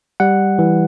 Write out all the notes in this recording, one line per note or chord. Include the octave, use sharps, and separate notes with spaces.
G3 F#5
E3